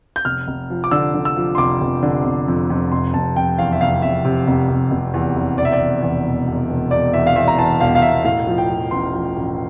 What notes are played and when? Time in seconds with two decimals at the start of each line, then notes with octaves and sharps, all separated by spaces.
0.16 G6
0.25 F1 F6
0.48 F1
0.70 F3
0.84 D6
0.91 D3 E6
1.14 D3
1.25 E6
1.36 F3
1.55 C6
1.58 F1 D6
1.81 F1
2.03 D3
2.26 F1
2.48 F2
2.70 F2
2.91 F1 C6
3.14 F1 A5
3.36 F1 G5
3.58 E2 F5
3.72 E5
3.81 F1 F5
4.02 F1 E5
4.25 C3
4.48 F1
4.70 F1
4.91 F1
5.14 E2
5.36 F1
5.58 E1 D5
5.65 E5
5.72 D5
5.80 E1
6.02 E2
6.25 E1
6.47 E1
6.69 E1
6.91 E1 D5
7.14 E2 E5
7.27 F5
7.35 E2 E5
7.48 A#5
7.59 E2 A5
7.80 E1 F5
7.95 F5
8.02 E1 E5
8.24 A2 F5
8.47 F3
8.58 G5
8.69 F3
8.91 A1 C6
9.14 F3
9.36 A1